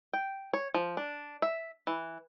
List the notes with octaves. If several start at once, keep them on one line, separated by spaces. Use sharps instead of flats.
G5
C#5
F3
D4
E5
E3